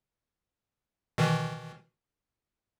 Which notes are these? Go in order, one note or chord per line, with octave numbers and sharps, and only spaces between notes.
B2 D#3 E3